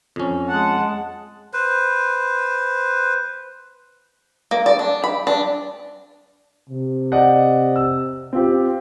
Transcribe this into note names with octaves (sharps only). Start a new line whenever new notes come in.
F2 C#4
G#3 F#5 A5
B4 C5
A#3
D5
D4
B5
D4
C3
D5 D#5 F#5
E6
C4 F4 G4